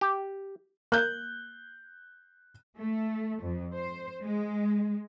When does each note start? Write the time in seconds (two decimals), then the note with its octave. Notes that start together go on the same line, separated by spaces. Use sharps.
0.01 G4
0.92 A#3 F#6 G6
2.79 A3
3.42 F2
3.74 C5
4.23 G#3